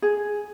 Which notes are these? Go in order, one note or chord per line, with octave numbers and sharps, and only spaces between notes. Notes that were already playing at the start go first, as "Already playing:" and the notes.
G#4